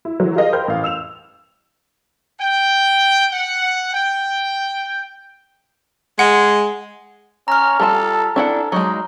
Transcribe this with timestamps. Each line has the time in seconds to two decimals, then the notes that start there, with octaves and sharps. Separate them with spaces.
0.05 E4
0.20 D3 E3 F#3
0.36 F4 G4 G#4 A#4 D#5 F5
0.52 A#4 C5 G5 B5 F6 G6
0.68 A1 F5
0.84 E6 E7 F7
2.40 G5
3.32 F#5
3.93 G5
6.19 G#3 F#5
7.48 C#4 A#5 F6
7.80 G3 F4 A4 A5
8.36 D4 E4 A4 F#5
8.72 F#3 G#3 D#4